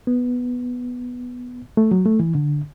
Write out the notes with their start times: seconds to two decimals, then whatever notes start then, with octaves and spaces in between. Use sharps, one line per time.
0.07 B3
1.77 A3
1.91 F#3
2.06 A3
2.20 E3
2.35 D3